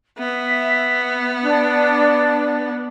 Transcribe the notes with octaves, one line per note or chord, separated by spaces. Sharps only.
B3 E5
D4